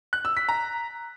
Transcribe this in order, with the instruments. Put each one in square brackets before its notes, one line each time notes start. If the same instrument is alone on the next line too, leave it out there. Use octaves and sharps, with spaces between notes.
[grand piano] F#6
E6
B6
A#5